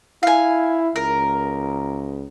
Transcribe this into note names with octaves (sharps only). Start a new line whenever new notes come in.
E4 F5 G#5
C#2 A#4